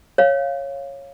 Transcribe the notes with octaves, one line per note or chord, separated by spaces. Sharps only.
C#5 F5